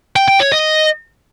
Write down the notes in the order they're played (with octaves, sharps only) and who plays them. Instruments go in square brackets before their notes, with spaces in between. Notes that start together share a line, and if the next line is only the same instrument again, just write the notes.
[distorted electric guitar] G5
G5
C#5
D#5